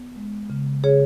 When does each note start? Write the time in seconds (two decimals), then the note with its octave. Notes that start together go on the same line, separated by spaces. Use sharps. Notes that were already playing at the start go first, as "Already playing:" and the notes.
Already playing: B3
0.16 G#3
0.50 C#3
0.84 C#3 G#4 C#5